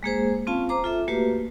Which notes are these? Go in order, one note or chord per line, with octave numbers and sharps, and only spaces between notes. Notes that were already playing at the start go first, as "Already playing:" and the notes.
G#3 A#3 G#4 C5
C4 C#4 F4 F5 A5
C5 A#5 D6
F4 A4 E5
A3 A#3 F#4 G4 B4